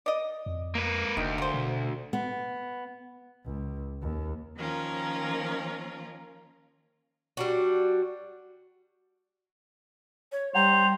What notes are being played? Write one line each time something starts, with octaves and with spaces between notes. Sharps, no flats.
D5 D#5
F2
A#3 B4
F1 D2 D#3
A#3 C5
B2
B3
C#2
D#2
D#3 F3 A#3 C#4 F4 A#4
G3 D4 F#4
C#5
G3 C5 F#5 G5 A#5 F7